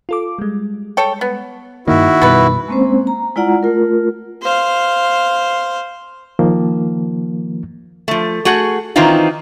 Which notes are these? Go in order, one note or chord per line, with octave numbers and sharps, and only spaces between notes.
F4 A4 D6
G3 G#3
A4 C#5 G5
B3
G2 D#3 A#3 E4 F#4
F#2 B2 G3 B3 B4
G#3 A#3 C4 C#4 C5
A#5
G#3 E4 F4 D5 F#5 A#5
A3 F4 A#4
C5 F5
D#3 F3 A#3
F3 A3
A3 F#4 G#4 F#5
D#3 E3 C4 D#4 F4